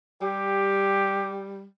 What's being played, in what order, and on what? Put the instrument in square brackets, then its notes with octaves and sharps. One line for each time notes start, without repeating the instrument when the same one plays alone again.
[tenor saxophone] G3 [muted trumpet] G4